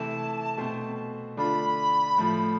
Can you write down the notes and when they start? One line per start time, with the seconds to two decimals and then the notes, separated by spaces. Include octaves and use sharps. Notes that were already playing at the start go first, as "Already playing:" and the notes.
Already playing: C3 E3 A3 E4 A5
0.57 B2 A3 C4
1.37 D3 A3 D4 F4 B5
2.18 A2 F3 A3